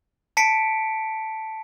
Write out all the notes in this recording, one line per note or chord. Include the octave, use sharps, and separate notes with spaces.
A5 B6 C#7 D7